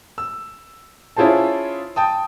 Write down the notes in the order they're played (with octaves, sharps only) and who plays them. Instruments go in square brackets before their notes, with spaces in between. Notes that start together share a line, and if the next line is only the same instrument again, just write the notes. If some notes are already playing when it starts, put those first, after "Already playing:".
[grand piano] E6
C#4 E4 F4 G#4 C5 A5
G5 A5 D#6